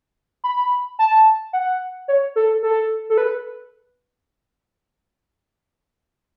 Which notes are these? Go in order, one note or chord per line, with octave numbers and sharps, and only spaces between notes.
B5
A5
F#5
C#5
A4
A4
A4
B4